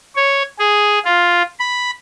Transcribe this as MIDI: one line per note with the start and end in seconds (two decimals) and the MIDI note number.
0.16 0.42 73
0.59 0.99 68
1.05 1.42 65
1.60 1.91 83